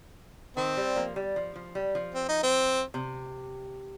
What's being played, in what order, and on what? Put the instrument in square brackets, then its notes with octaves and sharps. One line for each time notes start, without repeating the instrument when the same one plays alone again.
[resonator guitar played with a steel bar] D#3 [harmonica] C4
[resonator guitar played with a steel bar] G3
F3 A#3
G3
F3
F3
G3
F3
[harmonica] C4
D#4
C4
[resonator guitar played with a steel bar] C3